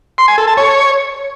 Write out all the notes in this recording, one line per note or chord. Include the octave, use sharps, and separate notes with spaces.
C6
G#5
A4
A5
C#5